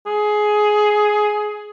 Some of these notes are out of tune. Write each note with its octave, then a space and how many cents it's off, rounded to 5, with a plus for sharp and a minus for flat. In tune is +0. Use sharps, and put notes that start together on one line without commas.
G#4 +15